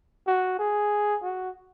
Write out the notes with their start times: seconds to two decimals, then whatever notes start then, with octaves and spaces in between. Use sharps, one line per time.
0.27 F#4
0.59 G#4
1.23 F#4